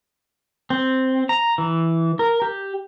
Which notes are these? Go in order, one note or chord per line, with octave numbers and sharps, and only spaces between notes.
C4
A#5
E3
A#4
G4